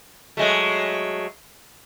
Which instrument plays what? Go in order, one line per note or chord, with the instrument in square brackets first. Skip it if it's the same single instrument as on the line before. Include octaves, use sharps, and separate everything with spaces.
[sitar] F#3 G#3 A3